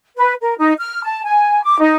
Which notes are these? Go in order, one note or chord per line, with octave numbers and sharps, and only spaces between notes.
B4
A#4
D#4
F6
A5
G#5
D6
D#4